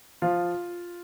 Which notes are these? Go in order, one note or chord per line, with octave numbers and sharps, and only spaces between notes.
F3 F4